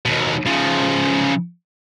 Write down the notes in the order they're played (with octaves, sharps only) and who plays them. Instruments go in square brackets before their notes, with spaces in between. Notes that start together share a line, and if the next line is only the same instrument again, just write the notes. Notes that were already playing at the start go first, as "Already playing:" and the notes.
[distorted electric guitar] D#2 B2
C#3 F3